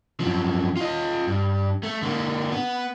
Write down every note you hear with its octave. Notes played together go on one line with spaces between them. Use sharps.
F#2 F3
F4 D#5
G2
A3
D3 A#3
B3